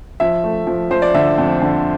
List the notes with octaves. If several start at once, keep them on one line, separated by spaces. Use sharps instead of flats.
F3 E5
A3
F3
F3 C5
D5
D3 E5
F2
D3